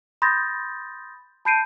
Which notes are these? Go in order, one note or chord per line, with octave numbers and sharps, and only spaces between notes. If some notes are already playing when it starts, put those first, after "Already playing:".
B5 C6 D#6 G6 A6 A#6
A5 B5 G6 C7 D7 D#7